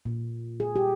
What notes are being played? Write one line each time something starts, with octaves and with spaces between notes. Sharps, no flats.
A#2
G#4
G4